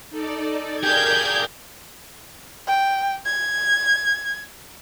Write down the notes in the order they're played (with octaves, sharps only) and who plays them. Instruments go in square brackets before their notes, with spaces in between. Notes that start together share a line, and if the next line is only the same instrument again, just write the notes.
[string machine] D#4 A4 D5
[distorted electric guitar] G4 G#4 [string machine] A#4 D5 F5 [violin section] G6 G#6
[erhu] G5
G#6